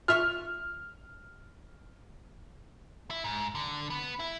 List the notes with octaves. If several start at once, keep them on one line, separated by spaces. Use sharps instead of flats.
F4 E5 C#6 F6
E4
G#2
D3
B3
E4